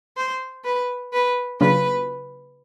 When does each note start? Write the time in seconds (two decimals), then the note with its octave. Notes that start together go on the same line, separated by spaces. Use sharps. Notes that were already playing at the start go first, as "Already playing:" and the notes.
0.17 C5
0.64 B4
1.13 B4
1.60 C#3 F#3 A#3 D4 F4 B4